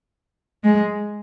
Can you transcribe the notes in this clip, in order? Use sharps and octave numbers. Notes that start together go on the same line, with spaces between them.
G#3